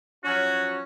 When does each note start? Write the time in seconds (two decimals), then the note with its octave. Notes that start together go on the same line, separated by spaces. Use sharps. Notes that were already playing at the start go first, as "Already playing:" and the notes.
0.24 F3 F#3 C#4 F#4